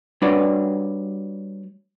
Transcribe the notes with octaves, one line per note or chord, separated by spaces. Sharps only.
G3 D4 F#4 B4 C#5 D5